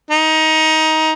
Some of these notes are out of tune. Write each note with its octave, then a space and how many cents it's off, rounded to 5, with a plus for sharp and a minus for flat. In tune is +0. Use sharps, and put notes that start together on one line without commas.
D#4 +20